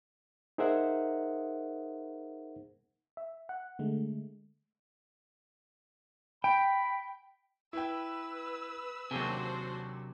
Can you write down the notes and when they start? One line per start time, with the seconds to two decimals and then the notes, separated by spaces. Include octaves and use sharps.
0.58 D#4 G#4 A#4 C5 E5 F#5
3.17 E5
3.49 F#5
3.79 D3 G#3 A3
6.44 G5 B5
7.73 E4 B4 G5 E6
9.11 D#2 C3 F#3 D4 F#4 G#4 C5 G#5